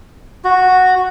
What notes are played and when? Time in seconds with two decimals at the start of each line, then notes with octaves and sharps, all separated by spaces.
0.45 F#4